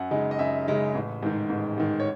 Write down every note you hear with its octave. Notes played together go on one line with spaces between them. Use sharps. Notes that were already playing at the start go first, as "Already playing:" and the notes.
Already playing: F#2 F#5
C#3 G#3 D#4
D#5
F#2 E5
C#3 G#3 D#4
A1
G#2 D#3
A1
G#2 D#3
C#5